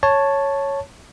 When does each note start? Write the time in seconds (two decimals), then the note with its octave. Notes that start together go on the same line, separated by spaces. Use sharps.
0.03 C#5 A5